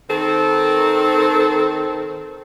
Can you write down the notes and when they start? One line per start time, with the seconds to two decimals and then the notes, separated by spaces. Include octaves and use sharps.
0.09 D#3 C4 A4